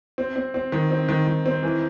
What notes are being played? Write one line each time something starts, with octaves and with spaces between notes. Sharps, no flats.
C4
C4
C4
D#3
C4
D#3
D#3
C4
E3